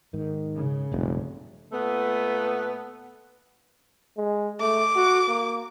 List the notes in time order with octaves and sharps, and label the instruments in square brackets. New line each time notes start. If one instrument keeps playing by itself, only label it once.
[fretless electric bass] G#2 [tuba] D#3
[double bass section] C#3
[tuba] F1 [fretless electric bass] B1 G2 A#2
[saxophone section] A#2 A3 B3
[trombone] G#3
[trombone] A3 [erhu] D6
[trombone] F#4
A#3